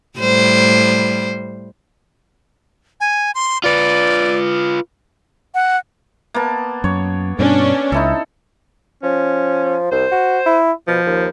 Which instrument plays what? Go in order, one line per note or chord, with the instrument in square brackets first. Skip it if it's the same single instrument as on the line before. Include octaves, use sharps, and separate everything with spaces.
[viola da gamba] A2 G3 C5
[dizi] G#5
C6
[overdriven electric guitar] F4 B4 [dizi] D5
[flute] F#5
[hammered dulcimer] A#3 B3 A5
[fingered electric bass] F#2 [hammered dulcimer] C#5
[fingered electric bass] G2 B2 [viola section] C#4 D4
[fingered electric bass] C#2 [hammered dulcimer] D#4 E4 A4
[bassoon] F3 [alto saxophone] C#4
[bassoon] C2 [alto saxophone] C5
[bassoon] F#4
E4
[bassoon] B2 [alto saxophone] F3
[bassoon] D#2